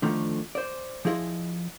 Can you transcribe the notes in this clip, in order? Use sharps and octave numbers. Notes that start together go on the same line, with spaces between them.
D3 D#3 F3 A3
C5 D5
F3 E4 G#4 D#5 C6